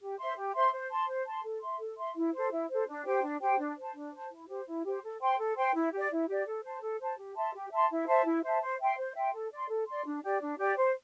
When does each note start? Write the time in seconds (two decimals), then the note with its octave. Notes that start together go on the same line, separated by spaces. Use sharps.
0.01 G4
0.18 C5 E5 C6
0.37 G4
0.54 C5 E5 C6
0.72 C5
0.90 A5 C6
1.08 C5
1.26 A5 C6
1.44 A4
1.62 E5 C6
1.79 A4
1.98 E5 C6
2.16 E4
2.33 C5
2.38 A4
2.51 E4
2.70 A4 C5
2.88 D4
3.06 G4 C5 G5
3.23 D4
3.41 G4 C5 G5
3.59 D4
3.77 C5 A5
3.95 D4
4.13 C5 A5
4.31 E4
4.48 G4 C5
4.67 E4
4.85 G4 C5
5.03 A4
5.20 C5 G5 C6
5.39 A4
5.57 C5 G5 C6
5.74 E4
5.92 G4 D5
6.10 E4
6.28 G4 D5
6.46 A4
6.64 C5 A5
6.82 A4
7.00 C5 A5
7.19 G4
7.36 E5 A5 C6
7.54 G4
7.71 E5 A5 C6
7.90 E4
8.07 C5 E5 A5
8.25 E4
8.43 C5 E5 A5
8.61 C5
8.79 E5 G5 C6
8.98 C5
9.15 E5 G5 C6
9.33 A4
9.52 D5 C6
9.69 A4
9.87 D5 C6
10.05 D4
10.24 G4 D5
10.41 D4
10.58 G4 D5
10.77 C5